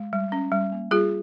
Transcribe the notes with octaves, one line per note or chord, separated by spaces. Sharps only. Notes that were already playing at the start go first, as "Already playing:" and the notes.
Already playing: G#3
G3
C#4
G3
A#3
G3 F4 G#4